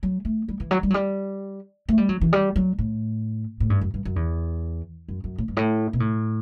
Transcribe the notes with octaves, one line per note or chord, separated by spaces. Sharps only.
F#3
A3
G3
E3
F#3
G3
F#3
G3
A3
G3
F#3
E3
G3
F#3
A2
A2
G2
F#2
G2
F#2
E2
F#2
F#2
A2
G2
A2
B2
A2